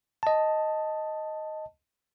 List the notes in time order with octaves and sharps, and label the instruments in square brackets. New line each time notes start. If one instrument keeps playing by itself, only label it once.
[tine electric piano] D#5 A5